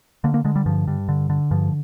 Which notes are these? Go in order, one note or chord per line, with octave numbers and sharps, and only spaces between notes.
D3 A#3
A#3
D3 G#3
G3
G2 F3
G2
D3
D3
G2 F3